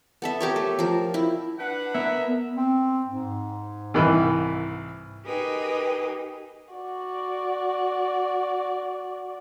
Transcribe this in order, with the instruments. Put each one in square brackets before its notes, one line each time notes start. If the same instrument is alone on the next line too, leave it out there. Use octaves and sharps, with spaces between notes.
[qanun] B3 A4 E5
G4 A#4 C#5
A3
F3 A#4
E4
[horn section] D4 B4 F#5
[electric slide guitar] B3 A#4 [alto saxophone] E5
[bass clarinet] C4
G#2
[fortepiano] C2 D#3 E3
[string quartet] D#4 G4 G#4 A#4 B4 D#5
[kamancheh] F#4 D5